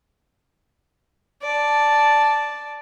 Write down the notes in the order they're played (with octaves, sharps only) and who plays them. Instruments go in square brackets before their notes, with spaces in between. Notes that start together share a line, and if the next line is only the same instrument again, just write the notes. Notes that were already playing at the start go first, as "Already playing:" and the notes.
[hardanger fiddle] D5 A5